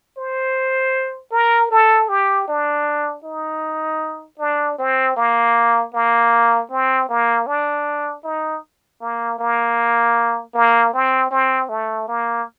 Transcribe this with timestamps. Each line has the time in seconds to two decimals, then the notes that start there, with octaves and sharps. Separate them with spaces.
0.18 C5
1.32 A#4
1.71 A4
2.09 G4
2.48 D4
3.24 D#4
4.39 D4
4.78 C4
5.17 A#3
5.93 A#3
6.71 C4
7.09 A#3
7.47 D4
8.24 D#4
9.01 A#3
9.39 A#3
10.54 A#3
10.93 C4
11.31 C4
11.69 A3
12.08 A#3